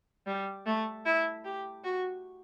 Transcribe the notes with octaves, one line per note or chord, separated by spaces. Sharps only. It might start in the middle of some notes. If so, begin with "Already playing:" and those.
G3
A3
E4
G4
F#4